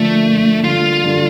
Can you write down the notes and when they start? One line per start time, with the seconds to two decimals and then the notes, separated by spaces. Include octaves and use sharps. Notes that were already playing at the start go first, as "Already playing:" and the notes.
Already playing: D3 F3 A3 A#3
0.27 D3 F3 A#3
0.64 D3 G3 A#3 F4
1.04 D3 G3 A#3